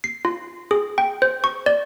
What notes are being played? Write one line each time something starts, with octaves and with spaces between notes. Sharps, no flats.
C7
F4
G#4
G5
C5
C#6
D5